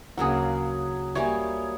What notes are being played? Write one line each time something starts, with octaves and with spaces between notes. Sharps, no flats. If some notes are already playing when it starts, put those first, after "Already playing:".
D2 C#3 F#3 A#3 F#4 G#4
G3 A#3 G4 C#5 E5 G#5